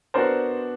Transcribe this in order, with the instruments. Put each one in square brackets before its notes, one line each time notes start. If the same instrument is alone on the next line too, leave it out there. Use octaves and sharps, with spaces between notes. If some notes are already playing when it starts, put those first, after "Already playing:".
[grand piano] B3 D4 F#4 [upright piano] A#4 C5